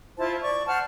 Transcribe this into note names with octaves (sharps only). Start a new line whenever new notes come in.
E4 F4 C5 A5
D5 C#6
C5 F#5 A5 F6